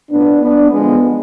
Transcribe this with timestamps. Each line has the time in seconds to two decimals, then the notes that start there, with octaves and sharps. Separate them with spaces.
0.11 A2 F3 B3 D4
0.41 B3 D4
0.71 E2 D3 F3 G#3 B3